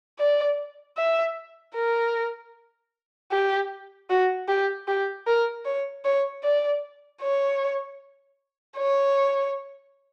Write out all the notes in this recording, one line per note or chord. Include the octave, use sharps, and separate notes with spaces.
D5
E5
A#4
G4
F#4
G4
G4
A#4
C#5
C#5
D5
C#5
C#5